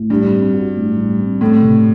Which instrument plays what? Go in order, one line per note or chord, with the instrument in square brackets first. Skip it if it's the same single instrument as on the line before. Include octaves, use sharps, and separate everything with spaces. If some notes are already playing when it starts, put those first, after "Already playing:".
Already playing: [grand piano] A2
[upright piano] G2 [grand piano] G3
[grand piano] C4
F#4
A2
G3
C4
[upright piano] A2 [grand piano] C4
[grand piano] C3